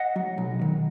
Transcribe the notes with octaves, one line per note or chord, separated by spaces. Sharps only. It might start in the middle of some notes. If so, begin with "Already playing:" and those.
Already playing: D#5 F#5
F#3
B1
D#3